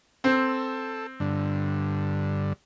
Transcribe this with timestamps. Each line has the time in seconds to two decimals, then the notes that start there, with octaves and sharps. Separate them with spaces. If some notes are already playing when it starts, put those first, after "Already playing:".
0.24 C4 A4
1.20 G2 D3